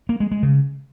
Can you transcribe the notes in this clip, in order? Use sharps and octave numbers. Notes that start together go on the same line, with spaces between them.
A#3
G#3
G#3
C#3